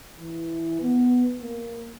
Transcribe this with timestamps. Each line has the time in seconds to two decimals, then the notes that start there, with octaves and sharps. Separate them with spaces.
0.17 E3
0.81 B3
1.41 A#3